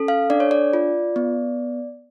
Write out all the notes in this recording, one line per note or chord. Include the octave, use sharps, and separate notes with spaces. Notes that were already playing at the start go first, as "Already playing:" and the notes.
Already playing: C#4 A4
F5
D4 D5
C#5
D5
F4
B3